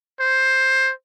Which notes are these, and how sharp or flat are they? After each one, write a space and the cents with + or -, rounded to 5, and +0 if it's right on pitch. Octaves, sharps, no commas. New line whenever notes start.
C5 +10